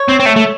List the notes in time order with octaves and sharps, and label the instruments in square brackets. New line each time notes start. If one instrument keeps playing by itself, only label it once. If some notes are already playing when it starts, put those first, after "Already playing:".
Already playing: [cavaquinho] C#5
[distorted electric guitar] C4
C4
A3
A3